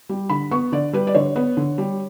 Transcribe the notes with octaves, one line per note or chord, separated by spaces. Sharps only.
G3
D3 B5
B3 C#6
D3 D5
G3 B4
D5
D3 C#5
B3
D3
G3